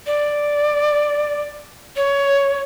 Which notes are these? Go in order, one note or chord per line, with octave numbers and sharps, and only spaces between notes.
D5
C#5